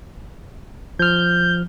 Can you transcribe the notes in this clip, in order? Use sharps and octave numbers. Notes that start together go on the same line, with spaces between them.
F3 F6 G6